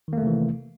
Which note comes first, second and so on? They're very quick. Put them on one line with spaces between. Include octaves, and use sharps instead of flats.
D#3 A#3 A3 C3 E3